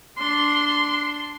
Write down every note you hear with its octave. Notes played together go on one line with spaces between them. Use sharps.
D4 C6